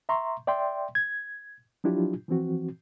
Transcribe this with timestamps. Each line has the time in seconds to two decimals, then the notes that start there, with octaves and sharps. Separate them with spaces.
0.09 E5 A#5 C6 C#6
0.47 D5 E5 G5 C6
0.95 G#6
1.84 F3 F#3 D4 E4 F4 G4
2.28 E3 F3 C4 F#4